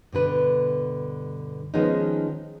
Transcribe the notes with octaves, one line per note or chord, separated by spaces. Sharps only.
G2 B2 D3 B4
D#3 F3 G#3 B3 C#4 D#4